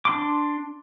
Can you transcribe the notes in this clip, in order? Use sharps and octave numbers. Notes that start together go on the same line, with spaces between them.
D4 C6 D6